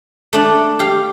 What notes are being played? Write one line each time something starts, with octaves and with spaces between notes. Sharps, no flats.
A3 D4
G4 F5